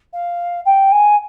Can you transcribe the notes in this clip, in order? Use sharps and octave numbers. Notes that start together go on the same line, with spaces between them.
F5
G5
G#5